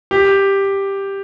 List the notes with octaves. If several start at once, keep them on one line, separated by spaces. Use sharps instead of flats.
G4